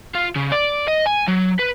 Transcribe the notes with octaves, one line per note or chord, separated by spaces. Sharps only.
F4
C#3
D5
D#5
G#5
F#3
B4